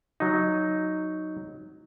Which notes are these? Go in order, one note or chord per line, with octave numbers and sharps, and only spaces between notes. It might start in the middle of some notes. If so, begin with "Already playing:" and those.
F#3 D#4